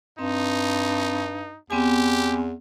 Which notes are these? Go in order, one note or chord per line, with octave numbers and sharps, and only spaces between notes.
G2 C4 D#4
E2 B3 C4 G4 G#5